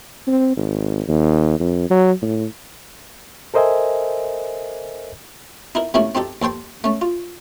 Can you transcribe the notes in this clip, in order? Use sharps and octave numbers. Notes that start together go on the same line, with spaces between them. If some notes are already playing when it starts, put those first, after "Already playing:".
C4
G#1
D#2
F2
F#3
A2
A4 A#4 C5 D#5 E5 G#5
D#4 E4 A#4
C3 A3 A#3 C#4 E4 F5
C4 D#4 G4 A4
D#2 A4 C5 G5 C6
A3 C#4
F4